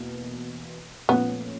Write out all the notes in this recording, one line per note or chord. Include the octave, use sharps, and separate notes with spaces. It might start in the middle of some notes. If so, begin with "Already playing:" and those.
Already playing: E2 B2 A#3
A#2 F3 A3 B3 C#4